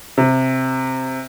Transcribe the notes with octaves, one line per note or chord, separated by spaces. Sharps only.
C3